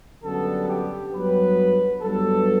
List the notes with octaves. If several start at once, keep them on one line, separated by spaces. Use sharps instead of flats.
F#2 D3 G3 B3 A4
G4
G2 F#3 B3 B4
G2 F#3 B3 A4